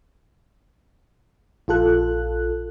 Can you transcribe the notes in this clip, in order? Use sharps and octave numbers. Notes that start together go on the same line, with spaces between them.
A#1 F4 A4 F#6